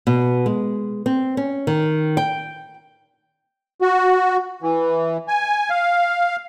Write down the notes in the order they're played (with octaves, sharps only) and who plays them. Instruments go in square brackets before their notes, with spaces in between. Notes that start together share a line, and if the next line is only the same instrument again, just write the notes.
[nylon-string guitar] B2
G#3
C4
C#4
D#3
G5
[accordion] F#4
E3
G#5
F5